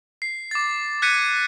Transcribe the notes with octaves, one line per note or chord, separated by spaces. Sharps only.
C7
D6 A6
F#6 G#6 B6 C#7 D#7